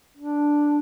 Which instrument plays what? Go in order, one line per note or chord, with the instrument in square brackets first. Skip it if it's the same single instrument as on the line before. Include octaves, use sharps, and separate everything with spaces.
[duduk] D4